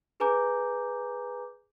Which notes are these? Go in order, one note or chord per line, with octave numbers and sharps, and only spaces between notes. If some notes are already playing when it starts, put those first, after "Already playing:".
G#4 B4 G#5 A#5 D6 G6